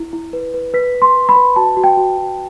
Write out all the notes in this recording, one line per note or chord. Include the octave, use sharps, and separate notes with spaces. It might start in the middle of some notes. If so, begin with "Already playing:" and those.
Already playing: E4
E4
B4
B4
B4 B6
B4
C6
B4
B5
B4
F#4 A5
F#4
G5
F#4
F#4